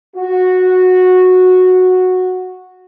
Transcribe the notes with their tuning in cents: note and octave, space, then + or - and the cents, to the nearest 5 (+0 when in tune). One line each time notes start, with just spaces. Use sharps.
F#4 -10